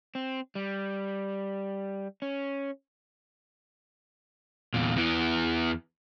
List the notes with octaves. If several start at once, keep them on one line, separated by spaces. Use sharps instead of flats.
C4
G3
C#4
E2 A#2
E2 E3